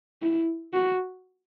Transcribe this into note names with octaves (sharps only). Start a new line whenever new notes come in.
E4
F#4